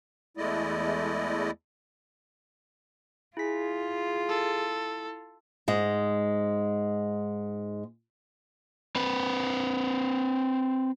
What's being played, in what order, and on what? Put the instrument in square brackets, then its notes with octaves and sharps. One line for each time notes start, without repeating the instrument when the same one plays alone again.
[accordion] E2 G#3 A3 E4 D5 D#5
[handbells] E4 B6 [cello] F4 [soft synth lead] G#4
[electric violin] A4
[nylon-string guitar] G#2 G#3
[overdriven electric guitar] C4 B4